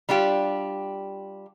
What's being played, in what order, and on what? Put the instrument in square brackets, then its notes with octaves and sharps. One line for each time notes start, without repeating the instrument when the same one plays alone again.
[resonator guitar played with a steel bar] G3 D4 F4 G4